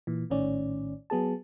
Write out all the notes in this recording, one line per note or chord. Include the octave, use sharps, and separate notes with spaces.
A#2 E3
A#1 A2 D#3 C#4 D5
F#3 B3 G#4 A5